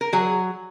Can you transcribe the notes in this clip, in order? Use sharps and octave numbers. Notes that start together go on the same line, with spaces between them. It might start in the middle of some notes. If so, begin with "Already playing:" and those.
A#4
F#3 G#4